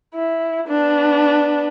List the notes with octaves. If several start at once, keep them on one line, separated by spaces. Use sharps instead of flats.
E4
B3 D4